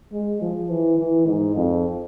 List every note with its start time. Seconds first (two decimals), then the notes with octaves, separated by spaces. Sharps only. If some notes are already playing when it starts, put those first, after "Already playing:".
0.13 G#3
0.42 F3
0.70 E3
0.99 E3
1.27 G#2
1.56 F2